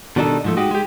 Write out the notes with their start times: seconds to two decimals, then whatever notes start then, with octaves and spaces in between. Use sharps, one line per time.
0.16 B2 D#3 G3 D4 D#4 A4
0.44 G#2 F3 A3
0.57 G#3 D#4 F#4 G4
0.71 G#3 G4